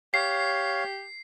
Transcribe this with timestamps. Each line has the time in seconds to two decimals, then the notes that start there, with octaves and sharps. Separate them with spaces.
0.14 G4 C#5 F5 C7